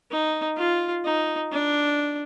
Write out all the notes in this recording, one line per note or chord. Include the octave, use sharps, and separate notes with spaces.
D#4
F4
D#4
D4